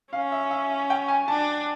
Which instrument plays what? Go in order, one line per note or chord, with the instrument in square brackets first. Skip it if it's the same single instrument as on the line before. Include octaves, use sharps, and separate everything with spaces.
[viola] C#4 [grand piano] F5
[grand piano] E5
E5
G5
G#5
[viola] D4 [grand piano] A5